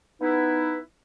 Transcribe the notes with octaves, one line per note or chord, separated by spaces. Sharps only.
B3 D#4 E4 B4